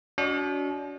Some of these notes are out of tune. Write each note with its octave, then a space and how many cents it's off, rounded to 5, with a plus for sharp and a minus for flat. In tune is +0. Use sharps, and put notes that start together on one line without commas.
D4 -45 F#4 +0 D#5 -30